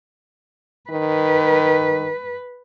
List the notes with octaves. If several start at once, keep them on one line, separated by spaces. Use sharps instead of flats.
D#3 B4